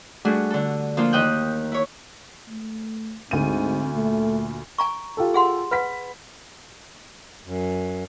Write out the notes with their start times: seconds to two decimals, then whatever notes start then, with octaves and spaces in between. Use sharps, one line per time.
0.25 G3 A3 D4 F#4 G#4
0.50 D3 A4
0.97 F3 A#3 D4 F4
1.13 D#2 D#5 G5 D#6 F#6 G6
1.72 E4 C#5
2.48 A3
3.31 D2 G#2 C4 D#7
3.94 A#2 A3
4.78 G#5 A#5 C#6
5.17 F4 G4 A4
5.34 G#4 F#5 C6
5.71 B4 F#5 B5 B6
7.45 F#2